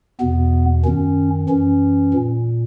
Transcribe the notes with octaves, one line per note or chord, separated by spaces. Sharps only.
E2 B2 B3
F#2 D#3 C#4
F#2 E3 C#4
A#2